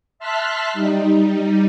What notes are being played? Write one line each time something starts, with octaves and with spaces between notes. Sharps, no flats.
E5 A5 C6 F6 F#6 B6
G3 D#4